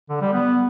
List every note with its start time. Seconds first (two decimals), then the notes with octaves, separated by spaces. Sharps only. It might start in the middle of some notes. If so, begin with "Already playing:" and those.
0.10 D3
0.21 G3
0.33 B3